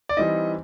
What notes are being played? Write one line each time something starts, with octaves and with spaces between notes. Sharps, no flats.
D5
E3 G3 C4 D#4 D#5